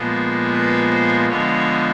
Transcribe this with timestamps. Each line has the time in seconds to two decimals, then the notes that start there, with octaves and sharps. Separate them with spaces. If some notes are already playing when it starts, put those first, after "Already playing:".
Already playing: A#2 F3 G#3 B3
0.53 B4
0.91 C5
1.29 D3 F3 G#3 B3 C#5